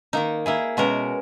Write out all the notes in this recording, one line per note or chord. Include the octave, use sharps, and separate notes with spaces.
D#3 A#3 D#4
A#3 E4 G#4
B2 G#3 C#4 F#4 A#4